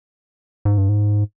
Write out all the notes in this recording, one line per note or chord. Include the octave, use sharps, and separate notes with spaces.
G#2
G2
G#2